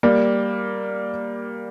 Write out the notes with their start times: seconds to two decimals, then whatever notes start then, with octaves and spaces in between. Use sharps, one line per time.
0.03 G3 A#3